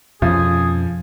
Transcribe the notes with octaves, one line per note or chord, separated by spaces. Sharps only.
F2 B2 F3 C#4 G#4